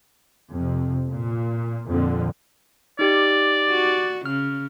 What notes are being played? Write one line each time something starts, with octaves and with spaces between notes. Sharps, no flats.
F2 C3
A#2
F2 A#2 D3
D#4 G4 D5
F#4
C#3 F6